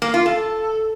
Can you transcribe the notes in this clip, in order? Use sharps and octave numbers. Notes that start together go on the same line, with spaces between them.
A#3
F4
A4